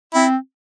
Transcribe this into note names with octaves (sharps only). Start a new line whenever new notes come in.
C4 E4